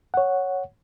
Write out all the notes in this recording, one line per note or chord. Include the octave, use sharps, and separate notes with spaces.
C#5 F#5